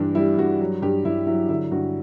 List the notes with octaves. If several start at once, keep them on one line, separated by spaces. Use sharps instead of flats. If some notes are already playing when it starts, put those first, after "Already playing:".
Already playing: G2 E3 D4
G3 E4
G2 F#4
F#3
G2 G4
G2 E4
F#3 E4
D3 E4
G2 F#4